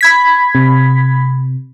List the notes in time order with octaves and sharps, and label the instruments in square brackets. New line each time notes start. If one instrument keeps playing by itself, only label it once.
[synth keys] B5 G#6 B6
[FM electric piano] C3